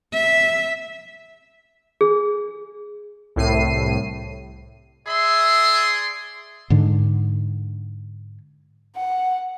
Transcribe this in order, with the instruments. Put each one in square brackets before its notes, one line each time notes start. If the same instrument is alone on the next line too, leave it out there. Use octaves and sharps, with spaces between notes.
[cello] E5
[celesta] G#4
[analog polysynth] C2 A2 C7 D#7
[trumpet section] G#4 D5 C6 [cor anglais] E5
[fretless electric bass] G#2 D3
[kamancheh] F#5